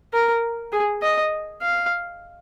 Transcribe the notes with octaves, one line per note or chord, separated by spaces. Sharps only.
A#4
G#4
D#5
F5